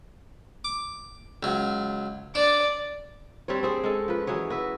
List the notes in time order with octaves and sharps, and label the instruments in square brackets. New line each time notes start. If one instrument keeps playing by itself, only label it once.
[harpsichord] D6
C#2 F#3
[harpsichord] D4 [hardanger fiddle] D5
[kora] G3 C4 D4 C#5
C4 G#4 C5
G#3 C#4 A4
F3 B4
E3 F#3 G#4 C#5
F#4 B4 E5